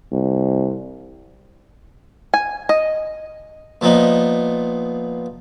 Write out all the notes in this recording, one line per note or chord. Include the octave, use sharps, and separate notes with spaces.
C2
G#5
D#5
A#2 F3 B3 D#4